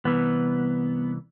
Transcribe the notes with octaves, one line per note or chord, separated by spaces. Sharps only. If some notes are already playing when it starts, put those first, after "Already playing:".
C2 E3 B3